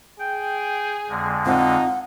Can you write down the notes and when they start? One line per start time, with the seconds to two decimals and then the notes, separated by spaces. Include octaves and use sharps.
0.19 G#4 G5
1.09 F2 D3 G#3
1.46 C4 D#4 F4 F#5